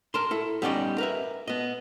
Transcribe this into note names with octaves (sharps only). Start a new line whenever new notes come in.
A#4 A5 C6
E4 A4
G3 B3 C#4 D#4 D5 D#5
A#4 B4 E5
B3 D#5